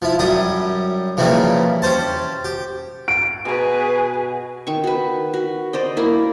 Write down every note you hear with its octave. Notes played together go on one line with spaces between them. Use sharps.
F3 E4
F#2 G3 G5 D#6
C#3 E3 F3 G3 A#3 C4
C#4 G4 C5 A5
G4
D7
B2 G#4 B4 C#6
D#3 C#6
F#4 B4
F#4
C5 D5 D#5
A#3 E4 A#4